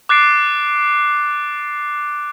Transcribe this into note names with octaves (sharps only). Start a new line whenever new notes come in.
D6 F#6 A6 C7 D7